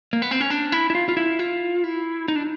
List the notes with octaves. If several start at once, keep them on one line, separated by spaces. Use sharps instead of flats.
A#3
B3
C4
C#4
D4
E4
E4
F4
F4
E4
F4
E4
D#4
D4